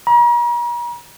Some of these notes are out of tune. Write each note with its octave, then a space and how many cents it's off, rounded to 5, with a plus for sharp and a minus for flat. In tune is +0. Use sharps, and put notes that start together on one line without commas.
A#5 +40